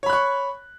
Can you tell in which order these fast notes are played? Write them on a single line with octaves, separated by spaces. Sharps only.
C#5 B5 F#6 C#6